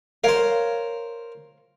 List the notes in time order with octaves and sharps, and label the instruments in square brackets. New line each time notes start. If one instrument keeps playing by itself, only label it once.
[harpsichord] A#4 C5 [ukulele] C#5 F5